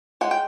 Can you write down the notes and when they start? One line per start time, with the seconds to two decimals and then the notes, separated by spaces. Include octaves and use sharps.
0.21 G#3 F#5
0.31 G5